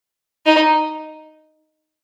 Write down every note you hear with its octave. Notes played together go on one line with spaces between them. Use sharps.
D#4